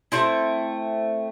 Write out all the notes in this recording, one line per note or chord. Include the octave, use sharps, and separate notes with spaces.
A3 C4 E4